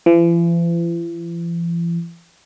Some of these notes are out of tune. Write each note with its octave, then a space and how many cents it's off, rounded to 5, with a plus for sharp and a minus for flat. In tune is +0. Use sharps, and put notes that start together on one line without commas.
E3 +45